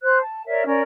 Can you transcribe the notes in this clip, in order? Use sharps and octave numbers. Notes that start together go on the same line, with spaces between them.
C5 F#6
A5
A#4 C#5 D5 E5
C#4 A#4 C#5 D5